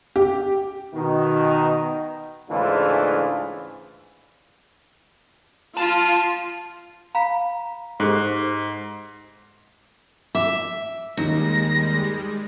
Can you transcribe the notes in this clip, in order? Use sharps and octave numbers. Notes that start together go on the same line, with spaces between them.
G4
B2 D#3 D#4
G#2 C#3 E3 A3 D4 F4
F4 F5 A5
F5 A#5 B5
G#2 G4 A4 C5
E5 D6
D#2 G3 G#3 D#4 A#6